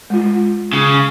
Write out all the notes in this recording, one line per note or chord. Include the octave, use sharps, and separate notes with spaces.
G#3 F4
C#3